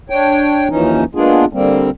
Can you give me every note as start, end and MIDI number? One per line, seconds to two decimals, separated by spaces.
0.10 0.68 62
0.10 0.68 73
0.10 0.68 79
0.70 1.04 39
0.70 1.04 52
0.70 1.04 53
0.70 1.04 61
0.70 1.04 63
1.15 1.45 56
1.15 1.45 58
1.15 1.45 59
1.15 1.45 62
1.15 1.45 65
1.15 1.45 68
1.53 1.90 50
1.53 1.90 55
1.53 1.90 58
1.53 1.90 60